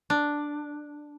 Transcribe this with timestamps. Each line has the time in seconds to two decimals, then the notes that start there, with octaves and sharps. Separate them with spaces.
0.10 D4